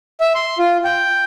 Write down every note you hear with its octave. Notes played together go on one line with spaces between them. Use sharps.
E5
C6
F4
G5